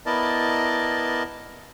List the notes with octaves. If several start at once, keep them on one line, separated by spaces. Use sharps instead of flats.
B3 E4 A#4 D5 D#5 A5